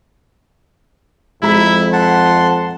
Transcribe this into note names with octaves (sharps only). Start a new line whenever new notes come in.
F2 G#3 E4 A#5 B6
F#5 A5 C6